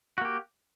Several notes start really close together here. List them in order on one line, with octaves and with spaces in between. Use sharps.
F#4 A#3 G4